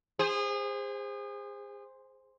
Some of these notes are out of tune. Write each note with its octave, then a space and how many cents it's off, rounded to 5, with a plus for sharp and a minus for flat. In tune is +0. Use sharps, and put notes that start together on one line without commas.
G#4 -30 C5 +0